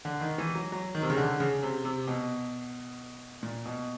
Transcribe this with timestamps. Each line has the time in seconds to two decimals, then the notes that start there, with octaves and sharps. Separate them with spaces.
0.05 D3
0.21 D#3
0.38 E3
0.55 F#3
0.72 F#3
0.95 D#3
1.02 C3
1.10 C#3
1.17 D3
1.40 C#3
1.63 C3
1.85 C3
2.07 B2
3.43 A#2
3.65 B2